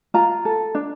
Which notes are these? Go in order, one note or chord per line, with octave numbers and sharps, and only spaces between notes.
F4 A#5
A4
D4